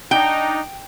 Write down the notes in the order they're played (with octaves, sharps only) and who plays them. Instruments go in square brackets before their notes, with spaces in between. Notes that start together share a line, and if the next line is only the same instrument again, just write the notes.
[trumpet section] D4 D#4 [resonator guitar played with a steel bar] G5